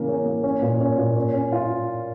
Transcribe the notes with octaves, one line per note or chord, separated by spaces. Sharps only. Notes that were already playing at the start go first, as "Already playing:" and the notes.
Already playing: C#3 E3 A#3
C#4
A#3
C#4
A#2
C#4
A#2
C#4
C#4
F4